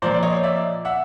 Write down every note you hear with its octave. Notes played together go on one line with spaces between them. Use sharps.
A#2 F3 A#3 C5 D5
D5
C#5 D#5
D5 E5
E5 F#5